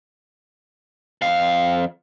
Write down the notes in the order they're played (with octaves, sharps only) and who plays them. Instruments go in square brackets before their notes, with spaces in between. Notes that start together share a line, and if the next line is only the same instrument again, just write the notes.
[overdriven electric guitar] F2 F5